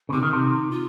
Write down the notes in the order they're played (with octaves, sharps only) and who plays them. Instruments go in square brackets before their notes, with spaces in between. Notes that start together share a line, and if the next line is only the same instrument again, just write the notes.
[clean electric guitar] C#3
[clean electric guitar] C3 [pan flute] D#4
[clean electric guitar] D#3
C3
[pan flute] F4